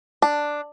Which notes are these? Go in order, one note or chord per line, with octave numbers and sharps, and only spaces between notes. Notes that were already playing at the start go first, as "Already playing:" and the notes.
D4